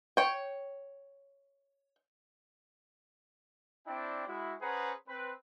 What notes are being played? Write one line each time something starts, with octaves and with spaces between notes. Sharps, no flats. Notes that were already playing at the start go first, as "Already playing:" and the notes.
C#5 G5
C4 D4 E4 D5 G5
G#3 E4 F#4
C#4 G#4 B4 C5 F#5 A#5
C4 B4